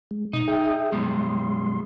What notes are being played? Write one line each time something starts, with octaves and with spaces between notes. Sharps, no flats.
G#3
B2 D#4
G#4 E5 G5
F#2 B2 G3 G#3 C6